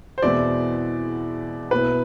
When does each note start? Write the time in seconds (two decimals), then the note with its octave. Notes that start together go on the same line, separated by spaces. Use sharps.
0.18 C5
0.22 E2 B2 G#3 C4 E4 D5
1.71 B2 B3 E4 B4